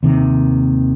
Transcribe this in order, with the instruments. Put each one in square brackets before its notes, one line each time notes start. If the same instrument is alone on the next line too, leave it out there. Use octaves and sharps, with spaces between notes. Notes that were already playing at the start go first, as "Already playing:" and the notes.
[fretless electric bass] D#2 C3 D#3